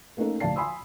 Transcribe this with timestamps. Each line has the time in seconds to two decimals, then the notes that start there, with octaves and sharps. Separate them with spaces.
0.17 A3 A#3 C#4 D#4 A4
0.40 D2 D5 F5 A5 C7
0.56 F5 G#5 B5 C6 D#6 E6